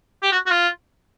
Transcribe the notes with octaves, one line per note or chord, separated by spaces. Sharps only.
G4
F#4
F#4
F4